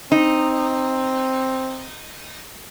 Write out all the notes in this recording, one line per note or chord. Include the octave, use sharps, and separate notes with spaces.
C4 D#4